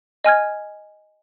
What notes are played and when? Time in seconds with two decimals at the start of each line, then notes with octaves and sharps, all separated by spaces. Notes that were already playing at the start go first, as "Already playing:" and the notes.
0.24 D#5 G#5 F6 G#6